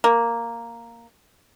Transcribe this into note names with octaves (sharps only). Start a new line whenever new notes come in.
A#3